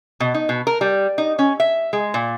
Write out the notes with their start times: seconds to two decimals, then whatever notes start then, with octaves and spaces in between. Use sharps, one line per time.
0.20 B2
0.34 D#4
0.49 B2
0.67 A#4
0.81 G3
1.18 D#4
1.39 C#4
1.60 E5
1.93 G#3
2.14 A#2